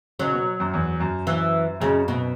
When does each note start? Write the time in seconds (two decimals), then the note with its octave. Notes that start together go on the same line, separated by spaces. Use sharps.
0.19 C#3 F#3
0.32 B2
0.60 F#2
0.73 E2
1.00 F#2
1.27 E3
1.80 F#2 C#3
2.08 B2